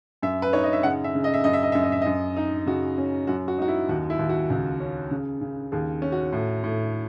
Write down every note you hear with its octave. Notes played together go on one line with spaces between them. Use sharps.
F#2 E5
B4
D#4 C#5
D#5
E5
C#3 F#5
E5
C#3
D#5
E5
F#2 D#5
E5
D#5
F#2 E5
D#5
E5
F#2 D#5
D#4
C#3 F#4
C#4
F#2 F#4
F#4
D#4 F#4
E4
D#2 F#4
E4
D#2
F#4
C#2
C#4
C#3
C#3
D#2 G#4
C#4
F#4
A2
A2